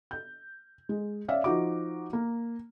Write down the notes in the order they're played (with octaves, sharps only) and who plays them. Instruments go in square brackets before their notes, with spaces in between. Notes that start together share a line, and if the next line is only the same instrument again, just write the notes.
[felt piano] G6
G#3
C#4 D5 E5 F5
F3 D#4 F#4 D6
A#3